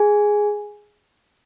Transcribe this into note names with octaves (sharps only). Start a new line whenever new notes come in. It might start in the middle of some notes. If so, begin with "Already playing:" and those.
Already playing: G#4 G#5